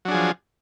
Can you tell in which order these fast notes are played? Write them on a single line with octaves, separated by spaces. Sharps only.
F#3 D4 G#4 F3